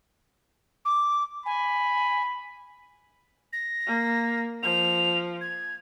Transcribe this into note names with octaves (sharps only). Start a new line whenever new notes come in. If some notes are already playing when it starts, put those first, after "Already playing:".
D6
G#5 B5
A#6
A#3
F3 F7
G#6